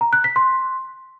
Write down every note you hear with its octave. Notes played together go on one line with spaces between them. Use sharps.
A#5
F#6
B6
C6